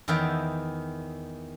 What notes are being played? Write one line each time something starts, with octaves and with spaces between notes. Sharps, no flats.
E2 D#3 B4 E5 G5